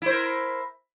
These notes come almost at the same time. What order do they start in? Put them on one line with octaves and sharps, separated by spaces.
E4 C5 A#4